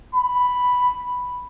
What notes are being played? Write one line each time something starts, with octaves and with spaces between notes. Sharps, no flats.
B5